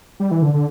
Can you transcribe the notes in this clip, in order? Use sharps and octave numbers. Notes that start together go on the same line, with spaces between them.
G3
E3
D3
D3